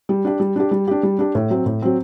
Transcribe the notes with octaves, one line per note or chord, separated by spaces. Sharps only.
G3
D4 G4
G3
D4 G4
G3
D4 G4
G3
D4 G4
A2
F#3 C4
A2
F#3 C4